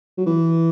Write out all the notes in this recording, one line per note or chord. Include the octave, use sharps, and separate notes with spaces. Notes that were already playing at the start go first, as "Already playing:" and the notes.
F#3
E3